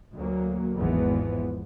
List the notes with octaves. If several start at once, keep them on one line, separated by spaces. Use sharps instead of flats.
D2 F#3 A#3
G#1 E2 G#2 E3 F3 B3